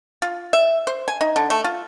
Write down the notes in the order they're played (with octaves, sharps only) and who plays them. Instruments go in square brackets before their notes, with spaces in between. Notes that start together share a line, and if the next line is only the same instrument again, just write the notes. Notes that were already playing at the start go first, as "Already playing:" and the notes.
[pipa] F4
E5
C5
G#5
D#4
D3
A3
F4